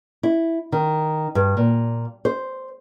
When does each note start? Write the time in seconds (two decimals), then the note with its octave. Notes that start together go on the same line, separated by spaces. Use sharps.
0.23 E4
0.72 D#3
1.35 G2
1.57 A#2
2.25 C5